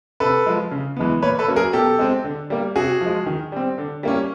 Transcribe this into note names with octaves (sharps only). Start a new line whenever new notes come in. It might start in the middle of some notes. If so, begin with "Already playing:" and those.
C3 A4 B4
F3 G#3
C#3
E3 G#3 B3
A#2 B4 C#5
A4 B4
F#3 A#3 C#4
G#4 A#4
B2 G4 A4
G#3 C4
D3
G3 A#3
C3 F#4 G#4
F3 G#3
D#3
G3 C4
D3
G3 A#3 C#4